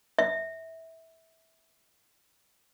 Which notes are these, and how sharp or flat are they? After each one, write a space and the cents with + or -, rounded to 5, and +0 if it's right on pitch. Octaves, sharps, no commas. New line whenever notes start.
E5 -20